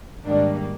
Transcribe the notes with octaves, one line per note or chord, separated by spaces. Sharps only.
G#1 G#2 D#3 G3 A#3 D4